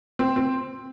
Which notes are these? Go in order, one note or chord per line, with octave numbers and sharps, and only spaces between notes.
C4
C4